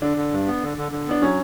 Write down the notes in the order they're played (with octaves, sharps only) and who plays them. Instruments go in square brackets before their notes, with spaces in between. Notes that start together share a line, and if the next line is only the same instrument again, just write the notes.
[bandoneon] D3 [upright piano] D4
[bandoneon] D3
G2
B3
D3
D3
D3
[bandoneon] B3 [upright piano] D4
[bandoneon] F#3 [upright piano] C#4